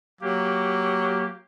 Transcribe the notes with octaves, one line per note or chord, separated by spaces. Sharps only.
F#3 A#3 G4